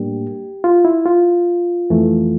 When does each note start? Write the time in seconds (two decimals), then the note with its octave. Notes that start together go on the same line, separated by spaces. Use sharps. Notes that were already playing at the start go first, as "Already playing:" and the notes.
Already playing: A2 G3 A#3 D4 G4
0.64 F4
0.85 E4
1.05 F4
1.90 F2 E3 A3